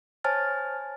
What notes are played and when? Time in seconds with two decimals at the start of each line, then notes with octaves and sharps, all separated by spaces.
0.24 C5 C#5 G#5 A5 F6 A6